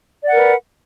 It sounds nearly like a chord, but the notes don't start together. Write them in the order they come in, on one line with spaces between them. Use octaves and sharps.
D5 F#5 A#4 B4